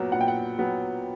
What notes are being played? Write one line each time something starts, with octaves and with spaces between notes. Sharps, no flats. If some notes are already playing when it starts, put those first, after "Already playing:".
Already playing: A#2 F#3 B3
A#2 F#5
G5
F#5
F#3 B3